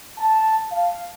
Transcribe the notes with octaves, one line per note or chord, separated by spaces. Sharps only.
A5
F5